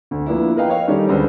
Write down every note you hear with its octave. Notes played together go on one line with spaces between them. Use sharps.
D2
F3 A#3 B3 D4 E4
A#4 B4 D#5 F5 G5
C#5 D#5 F5
D#3 G3 C#4 D#4 A4 D5
C#2 D3 B4 C5 D5